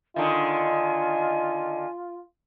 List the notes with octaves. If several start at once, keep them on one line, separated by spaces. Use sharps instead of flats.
D3 D#3 F4 D#5 G#5